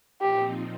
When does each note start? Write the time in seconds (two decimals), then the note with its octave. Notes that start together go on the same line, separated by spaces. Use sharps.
0.21 A#2 F3 C4 D#4 G4